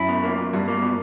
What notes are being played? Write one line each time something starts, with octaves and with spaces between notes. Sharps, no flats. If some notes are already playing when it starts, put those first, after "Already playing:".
Already playing: F#2 E4
B2
A#3
B2
G2 B2
A#3
B2